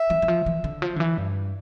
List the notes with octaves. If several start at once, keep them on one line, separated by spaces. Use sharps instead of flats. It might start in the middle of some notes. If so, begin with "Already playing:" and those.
Already playing: E5
E3
E3
F3
E3
D3
F3
D3
E3
G2